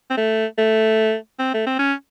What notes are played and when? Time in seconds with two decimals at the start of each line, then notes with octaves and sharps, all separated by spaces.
0.10 C4
0.17 A3
0.58 A3
1.39 C4
1.54 A3
1.67 C4
1.79 C#4